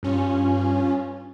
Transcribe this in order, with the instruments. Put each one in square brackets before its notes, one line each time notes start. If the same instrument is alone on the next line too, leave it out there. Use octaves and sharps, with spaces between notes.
[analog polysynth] G2 C#4 F4